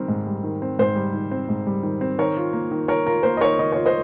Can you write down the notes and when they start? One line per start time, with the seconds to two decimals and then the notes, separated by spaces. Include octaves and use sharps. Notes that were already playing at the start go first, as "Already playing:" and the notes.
Already playing: D#3 G3 C4 A#4
0.08 G#2
0.26 G3
0.44 D#3
0.62 C4
0.79 G#2 C5
0.96 G3
1.14 D#3
1.31 C4
1.49 G#2
1.67 G3
1.83 D#3
2.01 C4
2.18 D#3 A#4 C#5
2.37 F4
2.53 A#3
2.71 D#3
2.88 D#3 A#4 C#5
3.06 F4 A#4
3.23 A#3 C5
3.37 D#5
3.41 D#3 A#4 C#5
3.59 D#3 D#5
3.72 F4 C#5
3.86 C5 D#5